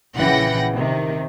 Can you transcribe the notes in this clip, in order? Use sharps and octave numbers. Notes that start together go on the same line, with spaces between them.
A#1 C#3 E3 F#5 G5 A#6
C3 D#3